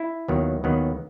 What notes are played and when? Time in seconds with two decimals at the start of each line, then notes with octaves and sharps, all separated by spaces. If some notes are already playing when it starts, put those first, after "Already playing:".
Already playing: E4
0.28 D#2 D#3 F#3 B3
0.64 D#2 D#3 F#3 B3